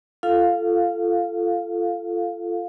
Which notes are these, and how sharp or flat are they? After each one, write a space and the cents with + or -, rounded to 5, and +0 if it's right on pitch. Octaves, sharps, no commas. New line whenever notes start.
F4 -20 A4 +0 F5 +10